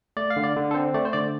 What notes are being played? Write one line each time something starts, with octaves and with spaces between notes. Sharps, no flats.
A3 D5
F5
D3
D5
D3
A4
C4 C5
A3 D5
C5
D3 D5